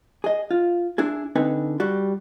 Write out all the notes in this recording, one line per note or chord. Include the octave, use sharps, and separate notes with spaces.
G#4 D#5
F4
D4 E4 G#4
D3 C4 D#4 B4 G#5
G3 F#4